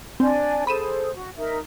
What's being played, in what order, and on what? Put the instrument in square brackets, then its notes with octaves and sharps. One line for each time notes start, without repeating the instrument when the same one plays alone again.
[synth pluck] C4 [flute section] D4 D5 G#5
[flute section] G#4 A4 C5 [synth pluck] B5 D#7 E7
[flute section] F#4
D#4 A#4 E5